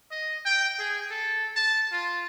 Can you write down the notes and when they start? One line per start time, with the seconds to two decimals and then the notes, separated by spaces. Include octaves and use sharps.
0.11 D#5
0.45 G5
0.79 G#4
1.11 A4
1.56 A5
1.92 F4